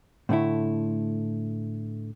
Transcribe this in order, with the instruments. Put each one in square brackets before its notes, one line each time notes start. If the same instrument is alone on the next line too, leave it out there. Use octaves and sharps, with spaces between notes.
[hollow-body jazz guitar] A2 D3 A3 E4